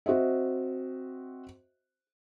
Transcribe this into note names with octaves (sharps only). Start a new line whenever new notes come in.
C4 F#4 C5 D#5 E5